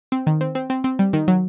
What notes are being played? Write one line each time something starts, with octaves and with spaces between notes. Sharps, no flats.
C4
D#3
C4
C4
C4
C4
G3
D#3
F#3